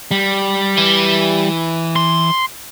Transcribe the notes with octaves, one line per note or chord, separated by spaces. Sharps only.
G3
E3
C6